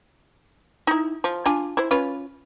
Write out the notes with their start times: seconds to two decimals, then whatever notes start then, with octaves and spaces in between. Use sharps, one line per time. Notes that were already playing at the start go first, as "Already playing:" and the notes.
0.87 D#4 E4
1.24 F3
1.46 D4 F4 G#5
1.77 E4 C5
1.91 C#4 F4 B4